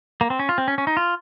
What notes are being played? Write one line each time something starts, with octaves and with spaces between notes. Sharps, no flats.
A#3
C4
C#4
F4
C4
C#4
C#4
D#4
F4